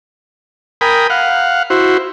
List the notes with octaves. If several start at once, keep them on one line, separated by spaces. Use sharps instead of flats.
A#4 G5 G#5 B5 D#6
F5 F#5
E4 F#4 C5